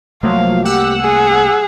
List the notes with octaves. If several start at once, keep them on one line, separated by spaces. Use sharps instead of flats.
C2 F3 F#3 A3 A#3 F5
G4 F#5 E6
G#4